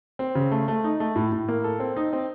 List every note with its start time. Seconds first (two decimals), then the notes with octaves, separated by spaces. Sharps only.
0.19 C4
0.35 C#3
0.52 A3
0.68 A3
0.84 D#4
1.00 A3
1.16 A2
1.32 A2
1.48 A#3
1.64 A4
1.80 C4
1.96 D#4
2.13 C4